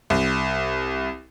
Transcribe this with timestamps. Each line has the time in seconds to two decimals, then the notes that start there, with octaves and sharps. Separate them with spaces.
0.10 C2